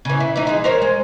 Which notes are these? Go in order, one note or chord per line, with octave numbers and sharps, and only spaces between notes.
C#3 E3
E4
E3 D#4
E3 G#3
A#4 C5 C#5
G#3